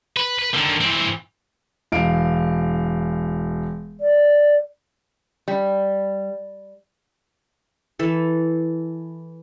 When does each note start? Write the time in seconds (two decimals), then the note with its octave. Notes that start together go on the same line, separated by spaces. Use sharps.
0.17 B4
0.39 B4
0.54 D3 D#3
0.81 E3 C4
1.92 E1 F5 D7
4.01 D5
5.48 G3
7.99 E3 A4